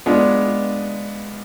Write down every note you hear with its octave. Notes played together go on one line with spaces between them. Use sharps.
G#3 B3 D4 F4